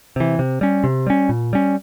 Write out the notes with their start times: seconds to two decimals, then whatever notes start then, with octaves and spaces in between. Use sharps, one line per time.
0.16 C3 E3
0.39 C3
0.61 G3 C#4
0.84 C3
1.07 G3 C#4
1.29 A#2
1.53 G3 C#4